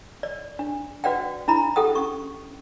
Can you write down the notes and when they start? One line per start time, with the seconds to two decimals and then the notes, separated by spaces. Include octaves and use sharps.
0.23 D5
0.59 D4
1.04 F#4 B4 D5 F#5 G5
1.48 D4 E4 A#5 B5
1.76 G4 A4 F#5 G5 D#6
1.95 C#4 C#6